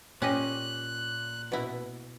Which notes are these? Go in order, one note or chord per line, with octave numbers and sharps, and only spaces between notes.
A#2 C#4 G4 D#5 F#6
B2 E4